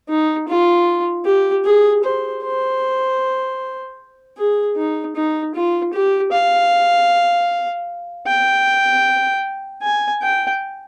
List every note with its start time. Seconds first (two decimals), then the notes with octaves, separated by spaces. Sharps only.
0.09 D#4
0.48 F4
1.25 G4
1.65 G#4
2.04 C5
2.43 C5
4.37 G#4
4.77 D#4
5.16 D#4
5.55 F4
5.93 G4
6.32 F5
8.27 G5
9.82 G#5
10.22 G5